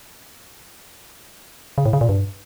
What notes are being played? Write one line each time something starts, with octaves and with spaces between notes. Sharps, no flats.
C#3
A2
C#3
A#2
G2